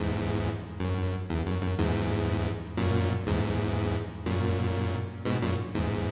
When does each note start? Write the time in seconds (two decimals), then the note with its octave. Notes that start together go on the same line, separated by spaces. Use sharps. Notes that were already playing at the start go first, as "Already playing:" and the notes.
Already playing: E2 G#2
0.80 F#2
1.30 E2
1.46 F#2
1.62 F#2
1.79 E2 G#2
2.77 F#2 A#2
3.27 E2 G#2
4.26 F#2 A#2
5.25 G#2 B2
5.42 F#2 A#2
5.75 E2 G#2